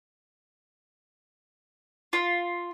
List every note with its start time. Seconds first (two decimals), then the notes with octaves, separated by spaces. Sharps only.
2.13 F4